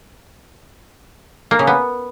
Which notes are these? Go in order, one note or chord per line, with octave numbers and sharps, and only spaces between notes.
A#3
C#3
B3